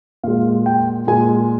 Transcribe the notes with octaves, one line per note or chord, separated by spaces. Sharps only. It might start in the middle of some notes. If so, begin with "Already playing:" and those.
A#2 G#3 F5
G5
A#2 G#3 G#5